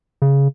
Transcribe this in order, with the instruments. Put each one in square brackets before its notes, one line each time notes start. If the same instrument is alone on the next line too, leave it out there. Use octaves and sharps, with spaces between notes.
[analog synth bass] C#3